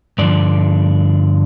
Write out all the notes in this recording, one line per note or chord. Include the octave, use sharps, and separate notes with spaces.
G2 D3 F3 D5